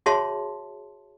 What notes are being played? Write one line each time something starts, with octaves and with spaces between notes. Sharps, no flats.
F#4 G#4 C#5 E5 A5 C6